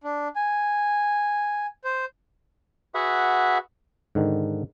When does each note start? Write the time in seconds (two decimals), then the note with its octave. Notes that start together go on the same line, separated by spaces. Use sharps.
0.04 D4
0.36 G#5
1.84 C5
2.95 F#4 G#4 B4 E5 F#5
4.15 G#2 D3 D#3